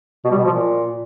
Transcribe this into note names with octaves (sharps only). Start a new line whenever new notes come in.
B2
G3
B2
F3
A#2